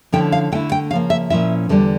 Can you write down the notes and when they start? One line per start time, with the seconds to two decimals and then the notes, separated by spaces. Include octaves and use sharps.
0.12 D3 F3 C#4 E4 G5
0.32 F5
0.52 D3 A3 E4 G5
0.72 G5
0.90 C#3 F5
0.93 F3 A#3
1.10 E5
1.30 A#2 F3 C#4 E4 E5
1.69 E2 D3 G3 D4